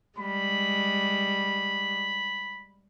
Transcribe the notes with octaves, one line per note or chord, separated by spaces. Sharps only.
G3 G#3 B5